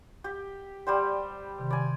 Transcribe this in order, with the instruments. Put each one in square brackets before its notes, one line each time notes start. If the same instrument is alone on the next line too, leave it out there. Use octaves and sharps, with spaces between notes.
[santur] G4
[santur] G3 G4 C5 [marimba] D5 G5
[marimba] C3 D#3
[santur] D5 G#5 [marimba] B5